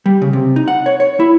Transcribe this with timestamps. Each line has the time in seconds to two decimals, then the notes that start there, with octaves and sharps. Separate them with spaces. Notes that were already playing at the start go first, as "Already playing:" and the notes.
0.06 G3
0.22 C#3
0.33 C3
0.56 D#4
0.68 F#5
0.86 C#5
1.00 C#5
1.20 E4